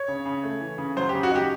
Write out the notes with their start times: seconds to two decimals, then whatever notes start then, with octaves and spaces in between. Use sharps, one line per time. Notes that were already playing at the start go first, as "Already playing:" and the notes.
Already playing: C#5
0.08 C#3
0.25 C#3
0.43 A3
0.60 E3
0.78 C#3
0.96 F#3 C5
1.09 G4
1.14 C#3
1.23 F#4
1.31 D#4 G4